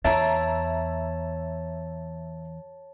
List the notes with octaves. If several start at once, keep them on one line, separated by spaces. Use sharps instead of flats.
E2 C#5 E5 A5 A#5 A6